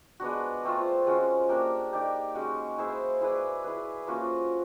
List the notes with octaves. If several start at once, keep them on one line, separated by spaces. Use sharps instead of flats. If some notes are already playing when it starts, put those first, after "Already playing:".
G#3 B3 D4 F#4
A3 C4 F4
F3 G#3 C#4 F#4
A#3 D4 G4 A#4
D#4 G4 A#4 D5
G#3 C#4 F#4
E4 G#4 C5 E5
E4 G#4 B4 D5
E4 G#4 B4
F3 A#3 C#4 F#4